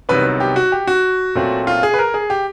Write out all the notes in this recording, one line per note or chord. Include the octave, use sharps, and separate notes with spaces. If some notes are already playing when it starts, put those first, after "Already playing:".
C2 C3 D#3 F#3 B3 B4
G4
F#4
G4
F#4
A#2 F#3 A3 C4
F4
G#4
B4
A#4
G#4
G4